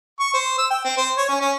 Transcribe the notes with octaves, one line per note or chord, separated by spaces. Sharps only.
C#6
C5
E6
G5
C4
C5
C#5
C#4
C#4